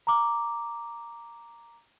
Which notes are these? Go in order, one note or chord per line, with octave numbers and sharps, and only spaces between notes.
A#5 D6